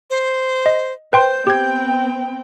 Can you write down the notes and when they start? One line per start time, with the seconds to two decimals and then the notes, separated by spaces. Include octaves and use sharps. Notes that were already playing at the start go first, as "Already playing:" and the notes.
0.10 C5
0.66 D#5
1.13 B4 C5 G5 C6 G6
1.47 B3 C4 G4 G5 G#6